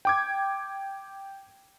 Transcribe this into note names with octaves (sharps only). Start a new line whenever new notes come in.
G5 D6 G#6